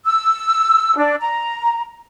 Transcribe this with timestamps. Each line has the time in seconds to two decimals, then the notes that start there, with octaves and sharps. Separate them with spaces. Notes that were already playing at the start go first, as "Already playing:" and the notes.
0.05 E6
0.97 D4
1.20 A#5